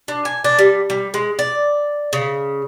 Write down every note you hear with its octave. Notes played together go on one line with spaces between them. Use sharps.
D4
G#5
D4
G3
G3
G#3
D5
C#3